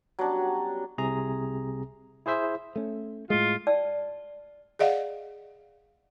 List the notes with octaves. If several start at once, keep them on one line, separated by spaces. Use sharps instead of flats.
F#3 G3 B3 C#4 D4
C2 C3 G#4 A#5
E4 G#4 C5 E5
A3 C#4
A2 G#3 F4
D5 G5 A5 E6
G#4 D5 D#5 F5 F#5